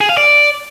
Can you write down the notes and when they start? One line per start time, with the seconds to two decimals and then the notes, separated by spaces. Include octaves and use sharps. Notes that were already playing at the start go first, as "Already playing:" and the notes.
0.01 G#4
0.09 F5
0.17 D5